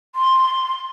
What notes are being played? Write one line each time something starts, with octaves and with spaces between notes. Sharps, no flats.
C6